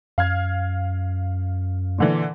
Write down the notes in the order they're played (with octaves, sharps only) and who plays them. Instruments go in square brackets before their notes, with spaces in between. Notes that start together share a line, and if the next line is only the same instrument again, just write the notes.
[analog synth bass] F#2 [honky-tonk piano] F5 F6 G#6
[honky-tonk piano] A#2 D3 E3